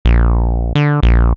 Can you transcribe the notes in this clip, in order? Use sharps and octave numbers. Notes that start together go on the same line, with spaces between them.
A#1
D3
A#1